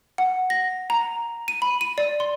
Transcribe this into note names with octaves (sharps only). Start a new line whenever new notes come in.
F#5
A#6
A#5
D#7
B5
D#7
D5
C6